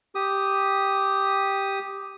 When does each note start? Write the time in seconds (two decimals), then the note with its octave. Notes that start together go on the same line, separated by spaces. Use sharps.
0.15 G4 D#6